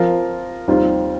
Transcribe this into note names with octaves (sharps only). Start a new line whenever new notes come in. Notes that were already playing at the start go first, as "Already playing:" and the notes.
Already playing: F3 C4 F4 A#4
D#2 D#3 G3 C4 F4